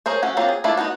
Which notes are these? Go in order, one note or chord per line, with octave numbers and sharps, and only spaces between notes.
G#4 A#4 C5 C#5
F#3 A3 C#4 F#4
F#3 A#3 C4 F4
G#4
A3 D4 E4 F4
B3 D#4 F4 F#4